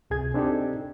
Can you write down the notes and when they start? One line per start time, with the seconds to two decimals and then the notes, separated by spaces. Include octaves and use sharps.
0.10 C#2 C3 G#4 G#6
0.34 C4 D4 D#4 G4 A4